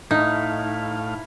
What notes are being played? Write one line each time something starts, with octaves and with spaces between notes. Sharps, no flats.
A2 D#4 E4 F5